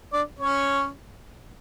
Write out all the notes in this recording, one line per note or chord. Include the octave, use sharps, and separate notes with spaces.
D4 D5
C#4 C#5